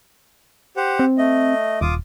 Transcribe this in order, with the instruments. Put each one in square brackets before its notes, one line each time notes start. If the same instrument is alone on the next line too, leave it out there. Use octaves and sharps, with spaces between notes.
[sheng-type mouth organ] G4 C5 F#5
[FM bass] C4
[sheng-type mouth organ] A3 D#5
[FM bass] D#1 [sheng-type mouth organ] F4 D6 D#6